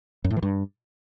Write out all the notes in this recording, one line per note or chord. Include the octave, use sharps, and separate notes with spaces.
F#2
A2
E3
G2